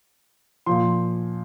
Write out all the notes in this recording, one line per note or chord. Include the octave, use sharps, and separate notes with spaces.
A#2 F3 C6